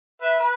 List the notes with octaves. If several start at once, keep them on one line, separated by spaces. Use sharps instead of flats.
B4 E5
B4